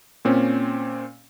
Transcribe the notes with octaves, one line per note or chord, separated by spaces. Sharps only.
A#2 C4 C#4